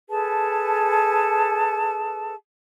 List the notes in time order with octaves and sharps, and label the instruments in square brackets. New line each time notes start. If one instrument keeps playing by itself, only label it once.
[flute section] G#4 A4 B4 A5